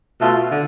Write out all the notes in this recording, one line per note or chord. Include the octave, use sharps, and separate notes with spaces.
B2 A3 F4
D3